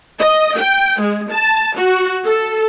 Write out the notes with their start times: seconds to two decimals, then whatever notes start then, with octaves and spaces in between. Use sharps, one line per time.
0.19 D#5
0.58 G5
1.00 G#3
1.31 A5
1.76 F#4
2.26 A4